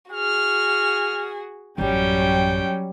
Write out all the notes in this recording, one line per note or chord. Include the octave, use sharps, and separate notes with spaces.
F#4 G#4 F6
A1 F#2 F#3 G3 C#4 G5